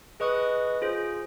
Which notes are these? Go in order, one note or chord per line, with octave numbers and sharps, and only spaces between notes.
G#4 B4 D#5 C#6 D#6 F#6
F4 G#4 C5